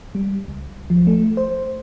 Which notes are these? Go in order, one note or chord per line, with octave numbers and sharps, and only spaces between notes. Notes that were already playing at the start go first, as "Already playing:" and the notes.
G3
C#2
F3
A3
C5